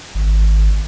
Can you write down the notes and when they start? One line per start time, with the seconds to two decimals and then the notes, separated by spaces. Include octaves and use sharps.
0.15 G#1